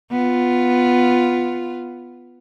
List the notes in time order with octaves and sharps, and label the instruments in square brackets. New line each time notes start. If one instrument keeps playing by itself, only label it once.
[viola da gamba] B3 F4